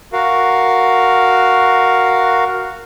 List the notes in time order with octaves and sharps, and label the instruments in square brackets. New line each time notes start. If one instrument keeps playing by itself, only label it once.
[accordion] F#4 A#4 F5